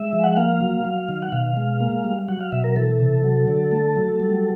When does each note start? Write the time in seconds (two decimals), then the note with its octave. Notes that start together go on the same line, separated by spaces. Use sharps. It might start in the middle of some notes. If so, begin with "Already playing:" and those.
Already playing: G#3 E5
0.13 F3
0.24 F#5
0.36 A#3 F5
0.61 F#3
0.85 F#3
1.09 D#3
1.22 F#5
1.32 B2 F5
1.57 G#3
1.80 A#3
2.04 G3
2.28 F#3 F#5
2.40 F5
2.52 B2 E5
2.64 A#4
2.76 E3 A4
3.00 C3
3.24 F#3
3.48 D3
3.71 A3
3.96 F#3
4.20 G3